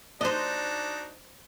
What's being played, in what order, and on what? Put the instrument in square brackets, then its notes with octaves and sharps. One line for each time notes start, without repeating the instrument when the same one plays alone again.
[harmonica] D4 D#4 F#4 [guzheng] C5 D#5